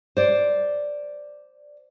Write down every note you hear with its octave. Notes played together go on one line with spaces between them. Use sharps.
C5 D5